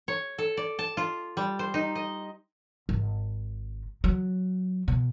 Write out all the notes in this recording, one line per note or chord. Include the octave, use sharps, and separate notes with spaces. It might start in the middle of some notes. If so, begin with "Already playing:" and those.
C#5
A4
D5
A5
F4
G3
C5
D#4
D#5
G#1
F#3
B2